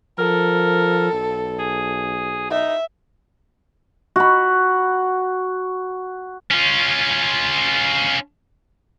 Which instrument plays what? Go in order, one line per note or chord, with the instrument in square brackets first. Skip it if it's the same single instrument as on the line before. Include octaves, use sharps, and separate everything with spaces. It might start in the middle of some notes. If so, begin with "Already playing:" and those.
[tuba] F3 [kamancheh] A4 [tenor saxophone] A#4
[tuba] B1
[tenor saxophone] G#4
[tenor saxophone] D#4 [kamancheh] E5
[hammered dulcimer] F#4 B5
[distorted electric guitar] C#4 F4